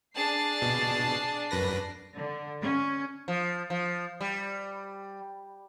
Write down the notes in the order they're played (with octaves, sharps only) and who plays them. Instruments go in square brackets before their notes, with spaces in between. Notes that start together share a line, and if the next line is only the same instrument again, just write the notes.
[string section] D4 C7 [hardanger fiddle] G#4 A5
[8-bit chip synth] B2
F#2 B4 A#6
[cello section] D3
C#4
[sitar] F3
F3
G3